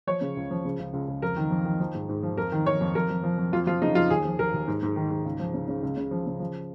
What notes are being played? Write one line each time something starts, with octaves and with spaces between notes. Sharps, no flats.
F3 C#5
C#3
C#2
F3
C#3
C#2
C#2
C#2
F2 A#4
D#3
F2
D#3
F3
G#2
G#2
F3
F2 A#4
D#3
D#3 C#5
F2
F2 A#4
F2
F3
F2
F2 F4
F3 F4
C#3 D#4
F2 F4
D#2 G#4
F3
D#2 A#4
D#2
G#2
G#2
D#3
G#2
C#2
F3
C#3
C#3
C#2
C#3
F3
C#3
F3